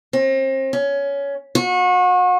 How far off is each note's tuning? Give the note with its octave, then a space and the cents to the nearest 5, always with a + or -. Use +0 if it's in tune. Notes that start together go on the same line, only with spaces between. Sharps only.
C4 +35
C#4 +15
F#4 -35